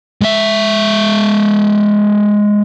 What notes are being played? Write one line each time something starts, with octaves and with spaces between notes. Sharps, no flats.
G#3 E5